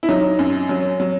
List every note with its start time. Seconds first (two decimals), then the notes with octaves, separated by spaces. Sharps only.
0.03 E4
0.09 F#3 D#4
0.39 F#2
0.69 F#3
1.00 F#3